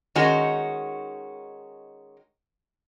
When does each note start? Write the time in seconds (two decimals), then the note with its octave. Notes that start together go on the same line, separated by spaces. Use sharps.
0.15 D#3 G#3 C#4 D#4 F#4